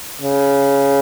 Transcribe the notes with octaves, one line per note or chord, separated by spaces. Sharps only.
C#3